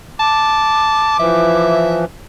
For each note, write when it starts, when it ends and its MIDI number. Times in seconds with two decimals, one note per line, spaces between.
0.20 1.18 81
0.20 1.75 86
1.19 2.05 52
1.19 2.05 53
1.19 2.01 76